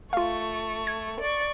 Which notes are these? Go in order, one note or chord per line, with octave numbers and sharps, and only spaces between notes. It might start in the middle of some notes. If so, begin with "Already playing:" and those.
A3 F4 F5 C#6
G#6
D5 C#6